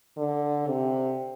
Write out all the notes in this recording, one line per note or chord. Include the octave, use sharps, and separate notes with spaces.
D3
C3